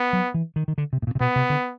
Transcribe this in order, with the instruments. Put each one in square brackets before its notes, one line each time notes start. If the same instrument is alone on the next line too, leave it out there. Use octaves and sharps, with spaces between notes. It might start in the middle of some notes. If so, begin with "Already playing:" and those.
Already playing: [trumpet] B3
[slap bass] F#3
E3
D#3
D#3
D3
C3
A2
A#2
C3
[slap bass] B2 [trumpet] B3
[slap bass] C3
D3